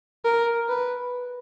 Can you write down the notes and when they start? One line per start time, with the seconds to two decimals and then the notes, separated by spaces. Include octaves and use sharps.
0.25 A#4
0.69 B4